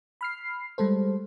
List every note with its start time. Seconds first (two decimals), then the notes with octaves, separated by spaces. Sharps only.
0.21 B5 F6 C7
0.78 G3 G#3 A4 C5